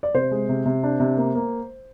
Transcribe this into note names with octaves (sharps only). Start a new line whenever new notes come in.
D5
C3 C5
G#3
C3
C3
D4
C3
A#3
A#3